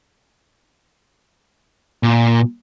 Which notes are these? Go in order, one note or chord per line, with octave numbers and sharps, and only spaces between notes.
A#2